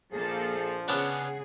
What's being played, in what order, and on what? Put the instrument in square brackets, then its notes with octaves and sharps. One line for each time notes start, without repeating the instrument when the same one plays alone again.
[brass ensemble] A#1 F3 [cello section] A#3 A4 [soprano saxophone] G#4
[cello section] C#3 G#4 [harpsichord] B3 C#4 D4 [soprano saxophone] F#5